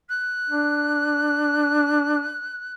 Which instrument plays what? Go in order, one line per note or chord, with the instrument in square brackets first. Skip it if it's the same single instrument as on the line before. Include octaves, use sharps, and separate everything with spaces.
[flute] F#6
[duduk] D4